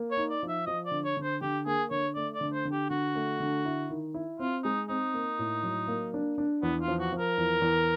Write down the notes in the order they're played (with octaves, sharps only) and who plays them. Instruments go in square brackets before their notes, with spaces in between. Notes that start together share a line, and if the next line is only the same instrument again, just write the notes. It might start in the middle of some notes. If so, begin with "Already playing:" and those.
Already playing: [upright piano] A#3
[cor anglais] C#5
[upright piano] D#4
[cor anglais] D5
[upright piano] F3
[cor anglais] E5
[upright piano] F3 [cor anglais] D#5
[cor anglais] D5
[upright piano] D3
[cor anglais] C#5
[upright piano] D3
[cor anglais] C5
[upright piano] D3 [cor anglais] G4
[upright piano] A#3 [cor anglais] G#4
[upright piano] D3 [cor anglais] C#5
[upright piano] A3 [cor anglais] D5
[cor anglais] D5
[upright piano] D3
[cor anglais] C5
[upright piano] D3
[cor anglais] G4
[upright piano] D3 [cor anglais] F#4
[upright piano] A3
D3
E4
D#3
E4
[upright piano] C4 [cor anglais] F4
[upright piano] G#3 [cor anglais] D#4
[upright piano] C4 [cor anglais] D#4
[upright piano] A#3
A2
F#3
A#3
D4
D4
[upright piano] E2 [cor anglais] B3
[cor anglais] F4
[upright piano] F3
[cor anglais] F#4
[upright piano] F3
[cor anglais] A#4
[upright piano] E2
E2